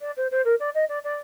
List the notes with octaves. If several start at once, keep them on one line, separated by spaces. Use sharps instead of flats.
D5
C5
C5
A#4
D5
D#5
D5
D5